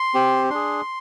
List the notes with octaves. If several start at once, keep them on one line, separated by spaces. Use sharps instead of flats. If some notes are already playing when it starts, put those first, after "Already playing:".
Already playing: C6
C4 G4
D4 G#4 C6